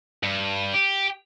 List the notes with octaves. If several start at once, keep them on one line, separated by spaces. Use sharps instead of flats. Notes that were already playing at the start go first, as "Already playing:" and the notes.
G2
G4